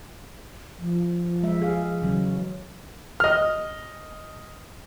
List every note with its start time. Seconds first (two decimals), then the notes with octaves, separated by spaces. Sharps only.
0.79 F3
1.43 G#3 E5
1.62 G#4 F5
2.02 C#3 E3 F#3
3.20 D#5 F6